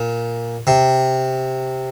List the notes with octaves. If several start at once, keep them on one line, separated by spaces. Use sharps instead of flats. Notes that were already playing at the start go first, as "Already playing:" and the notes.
Already playing: A#2
C3